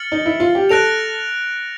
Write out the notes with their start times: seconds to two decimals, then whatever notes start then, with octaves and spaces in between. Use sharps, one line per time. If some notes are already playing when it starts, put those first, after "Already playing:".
Already playing: F6 A6 C#7 F#7
0.12 D#4
0.26 E4
0.40 F4
0.55 G4
0.70 A4 F#6 A#6 D7 F7